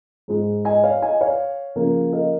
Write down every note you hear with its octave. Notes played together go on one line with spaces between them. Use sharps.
G#2 G#3
D#5 G#5
C#5 F5
D#5 G#5
C#5 F5
C#3 F3 A#3
A#4 D#5